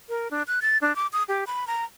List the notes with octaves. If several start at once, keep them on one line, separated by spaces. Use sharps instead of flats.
A#4
D4
F#6
A6
D4
D6
D#6
G4
B5
A#5